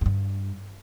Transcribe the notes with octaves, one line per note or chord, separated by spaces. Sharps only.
F#2
G2